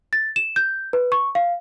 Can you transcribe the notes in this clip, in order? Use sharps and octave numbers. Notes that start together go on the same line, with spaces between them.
A6
E7
G6
B4
C#6
F5